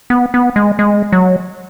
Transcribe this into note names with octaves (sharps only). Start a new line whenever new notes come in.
B3
B3
G#3
G#3
F#3